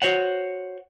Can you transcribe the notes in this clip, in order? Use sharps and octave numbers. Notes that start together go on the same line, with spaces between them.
F#4 C5 C#5 F#5